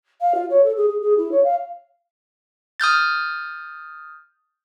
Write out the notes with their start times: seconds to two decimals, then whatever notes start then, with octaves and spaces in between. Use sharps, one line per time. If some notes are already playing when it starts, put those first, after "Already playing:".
0.20 F5
0.34 F4
0.50 C#5
0.64 A4
0.76 G#4
0.88 G#4
1.01 G#4
1.17 E4
1.31 C#5
1.43 F5
2.80 D#6 F6 G6 A6